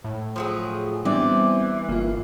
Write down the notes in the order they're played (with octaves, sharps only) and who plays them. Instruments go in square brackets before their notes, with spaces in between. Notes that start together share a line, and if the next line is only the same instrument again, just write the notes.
[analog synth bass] A2
[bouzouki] F3 F#3 G#4
[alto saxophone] E3 [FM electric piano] G3 B3 D4 [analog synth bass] C4 [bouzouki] D5
[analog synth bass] G1 [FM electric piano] A#3 F4